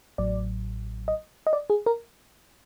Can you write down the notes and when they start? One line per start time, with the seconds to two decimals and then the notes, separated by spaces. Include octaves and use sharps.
0.18 A1 A2 F#3 D5
1.08 D#5
1.47 D#5
1.53 D5
1.70 G#4
1.86 A#4